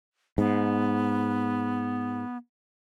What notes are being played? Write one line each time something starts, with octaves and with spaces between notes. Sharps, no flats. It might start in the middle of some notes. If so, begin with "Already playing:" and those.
G#2 B3